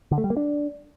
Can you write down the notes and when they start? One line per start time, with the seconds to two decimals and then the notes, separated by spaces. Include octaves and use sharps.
0.11 D3
0.18 A3
0.24 G3
0.30 A#3
0.37 D4